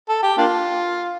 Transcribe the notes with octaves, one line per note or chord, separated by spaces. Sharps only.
A4
G4
A#3 D4 F4